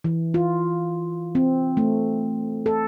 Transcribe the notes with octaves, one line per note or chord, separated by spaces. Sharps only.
E3
F4
C4
A3
A4